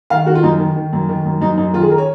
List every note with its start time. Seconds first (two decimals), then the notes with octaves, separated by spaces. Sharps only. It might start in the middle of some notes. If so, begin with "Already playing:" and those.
0.10 D#3 F5
0.26 D#3 F#4
0.35 F4
0.43 F#2 D#4
0.59 D#3
0.76 D#3
0.93 F#2
1.09 D#3
1.25 F#2
1.41 F#2 D#4
1.58 F#2 D#4
1.73 D#3 F4
1.83 G#4
1.91 A#4
1.98 C#5